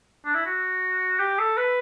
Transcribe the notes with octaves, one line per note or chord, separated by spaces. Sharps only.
D4
E4
F#4
G4
A4
B4